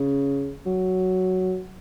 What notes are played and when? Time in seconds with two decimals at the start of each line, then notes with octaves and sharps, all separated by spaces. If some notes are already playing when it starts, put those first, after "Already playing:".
Already playing: C#3
0.66 F#3